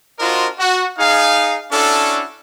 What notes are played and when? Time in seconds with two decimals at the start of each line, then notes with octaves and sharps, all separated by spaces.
0.20 D4 F4 F#4 A#4 C5 D#5
0.59 F#4
0.99 D#4 G#4 F5
1.71 C#4 D4 E4 F#4 A4